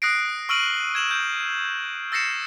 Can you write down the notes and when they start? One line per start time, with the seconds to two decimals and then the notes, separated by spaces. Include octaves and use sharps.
0.02 D#6 F#6 A#6 C7 D7
0.49 C#6 E6 F6 D7 D#7 F#7
0.95 G#6 E7 F#7
1.11 G6
2.12 E6 A6 A#6 C7 C#7 E7